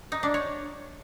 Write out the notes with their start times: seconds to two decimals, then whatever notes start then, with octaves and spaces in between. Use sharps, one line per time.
0.12 D#4
0.23 D4
0.34 C#5